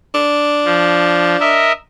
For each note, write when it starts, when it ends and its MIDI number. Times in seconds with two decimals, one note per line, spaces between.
0.15 1.72 62
0.65 1.36 53
1.41 1.72 70
1.41 1.72 75
1.41 1.72 76